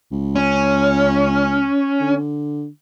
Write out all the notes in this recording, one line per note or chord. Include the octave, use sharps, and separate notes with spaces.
C#2
C#4
D3